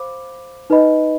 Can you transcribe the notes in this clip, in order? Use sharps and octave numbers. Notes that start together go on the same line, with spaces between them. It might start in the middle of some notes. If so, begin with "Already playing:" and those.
Already playing: C5 F5 B5 D6
D#4 B4 D#5 B5